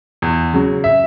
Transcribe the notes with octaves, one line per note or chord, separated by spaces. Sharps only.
E2
C#3 F#3
E5